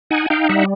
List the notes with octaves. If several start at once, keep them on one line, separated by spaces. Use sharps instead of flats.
D#4 F#5 G#5
D#4 F5 G5
G3 E5 F#5